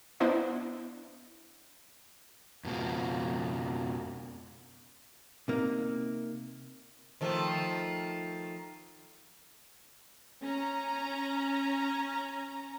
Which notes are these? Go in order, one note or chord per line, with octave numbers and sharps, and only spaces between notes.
B3 D4 E4 C5 D#5
F2 B2 F3
C3 A#3 D#4
D#3 F3 A3
C#4 A#5